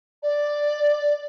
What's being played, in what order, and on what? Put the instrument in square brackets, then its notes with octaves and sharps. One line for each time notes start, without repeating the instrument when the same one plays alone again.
[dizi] D5